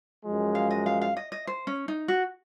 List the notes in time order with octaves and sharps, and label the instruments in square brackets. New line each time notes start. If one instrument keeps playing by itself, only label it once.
[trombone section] F#2 F3 G#3
[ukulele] F5
D#5
F5
F5
D#5
D#5
C5
C#4
D#4
F#4